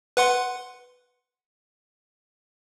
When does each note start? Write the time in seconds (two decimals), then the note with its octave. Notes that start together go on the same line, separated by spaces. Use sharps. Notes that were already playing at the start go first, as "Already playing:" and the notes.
0.17 B4 F#5 C6